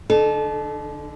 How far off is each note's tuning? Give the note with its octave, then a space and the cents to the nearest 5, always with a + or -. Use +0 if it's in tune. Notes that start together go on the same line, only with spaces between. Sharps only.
D3 +0 D#4 -40 A4 -25